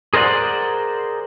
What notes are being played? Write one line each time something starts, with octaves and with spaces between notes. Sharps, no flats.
G#4 A#4 C5 D5 F#5